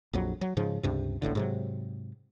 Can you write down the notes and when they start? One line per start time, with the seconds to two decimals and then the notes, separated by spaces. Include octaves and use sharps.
0.13 A#1 F2 F#3
0.41 F#3
0.57 G#2 C#3 F3
0.83 C#2 G2 C3
1.22 E1 A1 A2 D3
1.35 G#2 C3 F#3